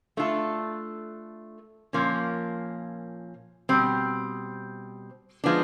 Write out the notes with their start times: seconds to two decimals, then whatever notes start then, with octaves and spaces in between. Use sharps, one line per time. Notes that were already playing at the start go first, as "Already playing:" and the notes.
0.17 A3 D4 F4 A4
1.93 A#2 F3 A#3 C#4
3.69 B2 G3 C4
5.44 F3 G#3 B3 D4